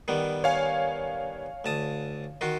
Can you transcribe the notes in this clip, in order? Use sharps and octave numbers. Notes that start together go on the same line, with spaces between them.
D#3 G3 B3
C#5 F5 G#5
D2 A5 D#6
D#3 F4 F#4